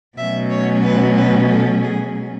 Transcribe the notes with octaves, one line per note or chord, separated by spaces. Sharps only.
B2 F#3 A3 C#4 E5
C#5
B4
B4
A4
G#4